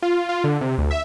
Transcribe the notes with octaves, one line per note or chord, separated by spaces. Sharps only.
F4
F4
D3
C3
D2
E5